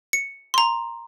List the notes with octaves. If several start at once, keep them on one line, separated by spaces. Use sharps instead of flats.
C#7
A#5 C6